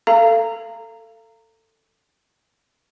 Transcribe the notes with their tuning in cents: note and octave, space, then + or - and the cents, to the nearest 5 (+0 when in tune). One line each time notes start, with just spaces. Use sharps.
A4 +20 F5 -30 A#5 -15